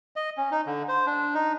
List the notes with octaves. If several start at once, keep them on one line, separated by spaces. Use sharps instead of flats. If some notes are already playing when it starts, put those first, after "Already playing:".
D#5
C#4
D#4
D3
C5
D4
D#4